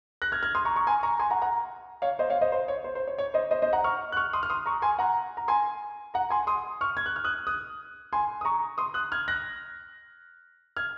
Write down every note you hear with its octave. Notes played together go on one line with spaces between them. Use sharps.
F#6 A#6
F6 G#6
F6 G#6
C6 D#6
A#5 C#6
A#5 C#6
G#5 C6
A#5 C#6
G#5 C6
F#5 A#5
F#5 A#5
C#5 F5
C5 D#5
C#5 F5
C5 D#5
C5
C#5
C5
C5
C#5
C#5
C5 D#5
C5 D#5
C5 D#5
F#5 A#5
C#6 F6
F#6
C#6 F6
C6 D#6
F6
C6 D#6
A#5 C#6
G#5 C6
F#5 A#5
A#5
G#5 C6
F#5 A#5
G#5 C6
C6 D#6
C#6 F6
G#6
F#6
F6
D#6 F#6
D#6 F#6
G#5 C6
D#6
A#5 C#6
C6 D#6
D#6 F#6
F6 G#6
F#6 A#6
F6 G#6